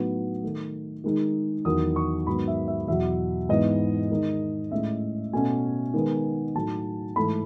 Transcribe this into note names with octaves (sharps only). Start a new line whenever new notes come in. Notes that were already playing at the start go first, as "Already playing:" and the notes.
Already playing: A2 F#3 B3 D#4
D#3 A3 D#4
D#3 G#3 D#4
E2 D#3 F#3 D#6
C#6
G#2 D#3 F#3 B3 B5
E5
E5
E2 B2 F#3 E5
G#2 E3 B3 D#4 D#5
D#3 G#3 D#4
A2 G#3 C#4 E5
B2 A3 C#4 G#5
D#3 G#3 B3 D#4
A2 F#3 A3 D#4 A5
G#2 E3 A3 B5